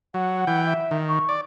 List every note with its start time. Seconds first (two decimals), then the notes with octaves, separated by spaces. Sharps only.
0.14 F#3 F#5
0.47 E3 G5
0.66 E5
0.91 D#3
1.08 C#6
1.29 D5